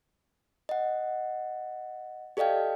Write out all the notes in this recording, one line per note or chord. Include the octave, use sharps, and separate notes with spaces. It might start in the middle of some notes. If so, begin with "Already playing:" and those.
D#5 F#5
G4 A4 D5 D#5 F5 G5